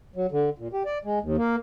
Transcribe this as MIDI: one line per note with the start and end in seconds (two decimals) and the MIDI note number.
0.16 0.26 54
0.32 0.50 50
0.58 0.68 46
0.73 0.83 67
0.85 0.98 74
1.05 1.19 56
1.21 1.36 39
1.37 1.56 58